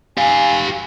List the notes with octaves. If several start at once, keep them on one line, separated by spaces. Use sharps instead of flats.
G4 F5 G#5